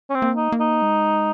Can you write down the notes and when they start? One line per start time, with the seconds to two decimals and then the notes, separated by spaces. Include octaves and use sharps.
0.10 C#4
0.15 C4
0.22 A#3
0.37 D#4
0.52 A#3
0.60 D#4
0.82 G#3